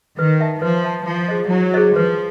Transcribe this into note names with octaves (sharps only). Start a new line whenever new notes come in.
D#3 B4
E5 A5
F3 B4
E5 A5
F3 E4
G#4 C5 D#5
F#3 E4
G#4 C5 D#5
F3 B4